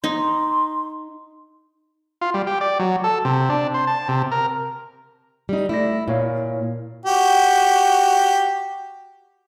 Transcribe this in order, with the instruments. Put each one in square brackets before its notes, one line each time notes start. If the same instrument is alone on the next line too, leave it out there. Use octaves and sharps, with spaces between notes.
[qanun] D#4 [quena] C6
[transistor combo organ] F4
G3
G4
D5
F#3
A4
C3
D4
C5
A5
C3
A#4
[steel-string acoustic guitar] G3 D#4
[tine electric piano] A3 D5 A#6 [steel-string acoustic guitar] E4
[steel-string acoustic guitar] A#2 [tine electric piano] E4 C#5 F5
[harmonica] F#4 G4